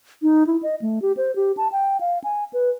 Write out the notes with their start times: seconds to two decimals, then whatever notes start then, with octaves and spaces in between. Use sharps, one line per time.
0.22 D#4
0.47 E4
0.63 D#5
0.82 A3
1.02 G4
1.17 C5
1.36 G4
1.57 A5
1.72 G5
2.01 F5
2.24 G#5
2.53 B4